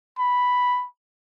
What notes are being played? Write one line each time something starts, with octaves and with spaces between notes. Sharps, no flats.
B5